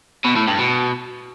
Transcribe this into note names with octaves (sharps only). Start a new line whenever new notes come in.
B2
A2
G2
B2